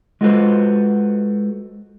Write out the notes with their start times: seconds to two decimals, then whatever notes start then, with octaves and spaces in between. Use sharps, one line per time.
0.21 G#3 F4 F#4 A4 B4 C5